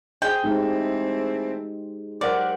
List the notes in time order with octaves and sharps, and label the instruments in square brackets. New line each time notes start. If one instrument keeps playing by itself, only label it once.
[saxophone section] G#4 [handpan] C5 [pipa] G5
[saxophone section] E3 A3 C4 [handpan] G#3 D#4 G4
[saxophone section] F#3 G4 A#4 [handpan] C5 F#5 [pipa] D5